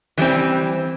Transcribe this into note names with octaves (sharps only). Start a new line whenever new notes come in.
E3 G3 C4